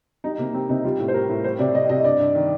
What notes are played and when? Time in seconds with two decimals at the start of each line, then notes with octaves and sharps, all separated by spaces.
0.24 G3 D#4
0.38 C3 A#3
0.54 G3 C4
0.69 C3 D#4
0.84 G3 F4
0.99 A2
1.08 C5
1.14 G3 A#4
1.29 A2
1.44 G3 C5
1.59 C3 D5
1.74 G3 D#5
1.89 C3 D#5
2.04 G2 D5
2.20 G2
2.35 D#3